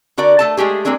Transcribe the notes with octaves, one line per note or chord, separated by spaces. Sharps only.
D3 F#4 A#4 D5
A3 A4 A5
G#3 A3 G4 G#4
G#3 A#3 C4 D4 G#4